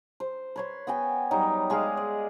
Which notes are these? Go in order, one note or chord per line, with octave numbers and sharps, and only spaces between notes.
C5
B4 C#5 C6
B3 F#4 G5 G#5
F#3 G3 D#4
G#3 G#4 D5 F5
D5